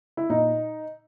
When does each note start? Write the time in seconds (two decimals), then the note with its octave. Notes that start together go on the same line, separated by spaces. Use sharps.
0.17 E4
0.30 A#2 D#4